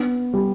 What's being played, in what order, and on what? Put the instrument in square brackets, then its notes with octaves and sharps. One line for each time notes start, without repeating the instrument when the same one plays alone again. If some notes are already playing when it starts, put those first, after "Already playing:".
Already playing: [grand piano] B3 [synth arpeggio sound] D4
[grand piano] G3